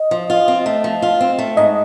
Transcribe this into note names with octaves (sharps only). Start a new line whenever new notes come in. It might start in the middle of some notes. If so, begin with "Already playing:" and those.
Already playing: D#5
F3
F4
C4
A3
F3
F4
C4
A3
G#2 D#5